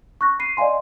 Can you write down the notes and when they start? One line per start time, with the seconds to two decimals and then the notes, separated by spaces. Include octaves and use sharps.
0.21 C#6 F#6 A#6
0.39 B5 C7 D#7
0.57 D5 D#5 F5 G#5 C6